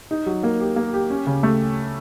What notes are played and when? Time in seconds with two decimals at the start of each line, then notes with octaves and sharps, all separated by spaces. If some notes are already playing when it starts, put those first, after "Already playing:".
0.11 D#4
0.26 F#3
0.43 A#3
0.60 G4
0.76 A#3
0.94 G4
1.10 C#4
1.26 C#3
1.43 A3